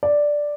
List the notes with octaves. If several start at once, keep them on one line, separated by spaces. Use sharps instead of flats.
D5